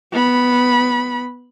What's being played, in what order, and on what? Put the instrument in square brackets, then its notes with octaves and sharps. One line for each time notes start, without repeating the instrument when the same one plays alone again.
[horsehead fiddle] B3 B5